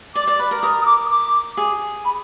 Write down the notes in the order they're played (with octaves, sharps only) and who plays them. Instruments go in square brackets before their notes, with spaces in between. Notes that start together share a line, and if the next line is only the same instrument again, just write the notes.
[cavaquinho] D5 [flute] D6
[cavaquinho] D5
B4
A#4
[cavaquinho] A#4 [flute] D#6
[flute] D#6
D6
D#6
D6
[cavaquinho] G#4
[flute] B5